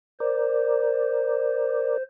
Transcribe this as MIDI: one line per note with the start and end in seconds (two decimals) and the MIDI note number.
0.20 1.97 70
0.20 2.03 72
0.20 1.97 74